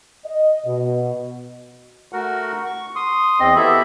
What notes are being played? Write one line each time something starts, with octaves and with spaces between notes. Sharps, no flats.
D#5
B2
A3 F#4 A#4 F#5
C#6
C6 D#6
E2 C4 D#5
B3 E4 G4 A4 E5 B5